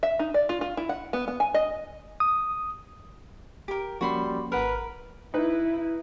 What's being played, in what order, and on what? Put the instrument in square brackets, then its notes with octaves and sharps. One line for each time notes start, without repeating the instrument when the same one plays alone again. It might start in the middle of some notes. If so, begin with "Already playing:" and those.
[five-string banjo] E5
D#4
D5
F4
F4
E4
F#5
B3
B3
G#5
D#5
[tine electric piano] D#6
[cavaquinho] G4 A#4
[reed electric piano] F3 A#3 C#4 [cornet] G3 [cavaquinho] F#4 B5 C6
[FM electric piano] G#1 F#5 F6 [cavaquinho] A#4 [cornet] B4
[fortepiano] D#4 B4 [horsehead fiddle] E4